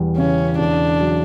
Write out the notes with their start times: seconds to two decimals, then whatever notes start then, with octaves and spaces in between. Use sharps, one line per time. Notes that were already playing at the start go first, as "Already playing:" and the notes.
Already playing: E1 E2 G3
0.17 C#3 C#4
0.59 E1 D4
1.00 F#3